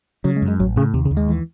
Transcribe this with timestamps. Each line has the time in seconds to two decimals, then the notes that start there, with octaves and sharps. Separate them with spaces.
0.24 C#3 F#3
0.36 G#3
0.42 F#2
0.48 G#3
0.60 A1 F#3
0.76 A2 C#3
0.94 D#2 C3
1.05 C#3
1.11 D#2
1.17 G#3
1.28 E3